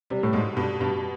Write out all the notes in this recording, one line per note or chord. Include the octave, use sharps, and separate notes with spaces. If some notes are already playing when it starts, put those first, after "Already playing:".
C3 G3
A2
G#2 B2
G2 B2
G2 B2